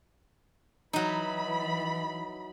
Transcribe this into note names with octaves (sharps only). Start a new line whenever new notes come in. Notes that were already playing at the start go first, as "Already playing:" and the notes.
E3 F#3 D#4 B5